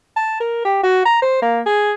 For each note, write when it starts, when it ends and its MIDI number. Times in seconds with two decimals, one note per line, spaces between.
0.16 0.38 81
0.40 0.63 70
0.65 0.82 67
0.83 1.04 66
1.05 1.17 82
1.22 1.39 72
1.42 1.60 58
1.66 1.93 68